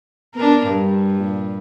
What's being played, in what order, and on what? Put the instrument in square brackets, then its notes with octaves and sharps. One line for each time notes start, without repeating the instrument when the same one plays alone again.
[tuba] B3 [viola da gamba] D4 A#4
[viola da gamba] G2 [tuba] G3
[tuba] A#2